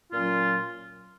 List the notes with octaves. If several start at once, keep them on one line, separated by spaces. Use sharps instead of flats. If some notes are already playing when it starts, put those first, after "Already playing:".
A#2 F#3 C#4 F4